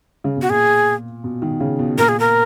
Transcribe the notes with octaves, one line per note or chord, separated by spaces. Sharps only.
C#3
B2
F#4
A#2 G#4
B2
D#3
C#3
B2
A#2 A#4
G#4
A#4